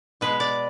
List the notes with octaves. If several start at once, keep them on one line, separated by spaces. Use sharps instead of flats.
B2 G#3 B4
D5